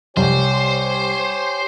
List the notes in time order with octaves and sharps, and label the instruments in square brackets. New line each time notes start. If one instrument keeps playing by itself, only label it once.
[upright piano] C2 [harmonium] G4 C#5 G#5 [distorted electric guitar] C5